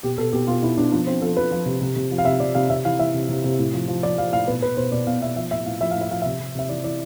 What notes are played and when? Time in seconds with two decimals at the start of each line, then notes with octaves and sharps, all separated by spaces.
0.03 B2 G4
0.18 B2 A4
0.33 B2 G4
0.47 B2 F4
0.62 B2 E4
0.77 B2 D4
0.92 F3 D4
1.07 F3 C4
1.22 F3 A4
1.36 F3 B4
1.51 F3
1.66 C3
1.81 C3
1.96 C3
2.11 F3
2.18 F5
2.25 C3 E5
2.40 C3 D5
2.55 C3 F5
2.70 C3 E5
2.85 E3 F5
2.99 E3 E5
3.14 C3
3.29 C3
3.44 C3
3.59 A2
3.73 F3
3.88 F3
4.03 F3 D5
4.18 F3 F5
4.32 A2 F5
4.47 B2 B4
4.62 B2 B4
4.77 B2 C5
4.92 B2 D5
5.07 B2 F5
5.21 B2 E5
5.36 F3 E5
5.51 A2 E5
5.66 A2 F5
5.81 F3 E5
5.91 A2 F5
6.01 E5
6.10 F3 F5
6.22 C3 E5
6.40 C3
6.55 C3 E5
6.69 E3 D5
6.84 E3 D5